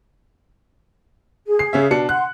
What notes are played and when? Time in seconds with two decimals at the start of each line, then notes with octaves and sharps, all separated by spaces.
1.47 G#4
1.59 C7
1.73 C#3 C#4 E5
1.91 B2 D4 C#7
2.09 F#5 C6 F#6